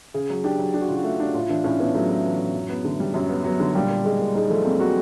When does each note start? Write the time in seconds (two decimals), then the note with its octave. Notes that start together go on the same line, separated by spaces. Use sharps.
0.14 C#3 G#4
0.30 F#3
0.44 D4 G4
0.59 F#3
0.74 D4 G4
0.81 F#4
0.88 C#3 F4
0.96 F#4
1.04 A3
1.20 D4
1.34 A2 F4
1.49 E3 D4
1.64 A2 C#4
1.80 A2 B3
1.95 F#3 A3
2.09 A3
2.25 E3
2.39 A2
2.54 F#2
2.69 B3
2.85 D3
3.00 G3
3.14 F#2 F#3
3.30 B3
3.44 F#3 B3
3.60 D3
3.74 A#2 G3
3.89 A#2
4.05 A#2 G#3
4.20 A#2
4.34 G#3 D#4
4.50 F3 A3
4.65 A#3 C4
4.80 A#3 F#4